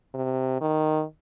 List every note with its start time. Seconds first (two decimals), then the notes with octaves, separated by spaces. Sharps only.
0.14 C3
0.61 D#3